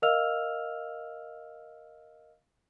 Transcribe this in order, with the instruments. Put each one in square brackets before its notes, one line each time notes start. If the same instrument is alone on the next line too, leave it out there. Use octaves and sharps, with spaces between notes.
[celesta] A#4 D#5 F5 E6 F6 F7